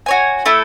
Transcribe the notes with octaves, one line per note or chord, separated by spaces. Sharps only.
F#4 C#5 G#5
A3 E4 A4